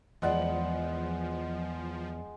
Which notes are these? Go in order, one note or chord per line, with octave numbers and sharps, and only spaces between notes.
E2 F3 G#3 D5 F#5